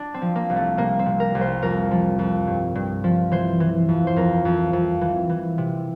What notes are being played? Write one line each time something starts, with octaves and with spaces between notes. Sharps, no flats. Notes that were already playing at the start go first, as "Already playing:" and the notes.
Already playing: D4
C4
F3
A#3
C2
A3
C3 A#3
C4
C3
A#4
C2
C5
F2 A#4
F3
F2
G2
G2
F3
E3 C5
E3
F2
C5
F2 A#4
F2
F2
E3
E3
C3